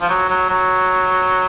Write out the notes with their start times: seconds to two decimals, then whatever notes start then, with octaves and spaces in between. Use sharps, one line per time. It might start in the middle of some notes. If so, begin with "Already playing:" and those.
0.01 F3
0.09 F#3
0.29 F#3
0.50 F#3